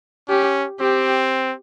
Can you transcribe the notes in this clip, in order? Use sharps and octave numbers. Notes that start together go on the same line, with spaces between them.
C#4 G4
C4 G4